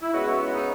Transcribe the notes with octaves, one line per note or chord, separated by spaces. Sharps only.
E4
C#3 G#3 B3 F#4
E4
D#4